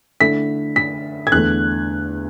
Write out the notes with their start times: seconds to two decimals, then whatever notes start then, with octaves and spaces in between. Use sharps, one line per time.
0.20 D3 A3 E4 B6
0.76 B6
1.27 G#6
1.32 E2 D3 A3 F#6